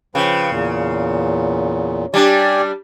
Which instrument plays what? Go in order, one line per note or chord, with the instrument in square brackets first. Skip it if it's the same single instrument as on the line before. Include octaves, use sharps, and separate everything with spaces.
[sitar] C#3 [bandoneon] F3 B4 G5
[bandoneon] E2 A#2
[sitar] G3 D4 [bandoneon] G4 D5 G#5